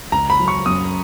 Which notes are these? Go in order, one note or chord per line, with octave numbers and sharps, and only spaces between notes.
C#2 A#5
B5
F#3
C#6
F#2 D#6